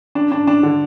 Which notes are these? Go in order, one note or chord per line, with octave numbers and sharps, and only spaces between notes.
D4
D4
D4
D3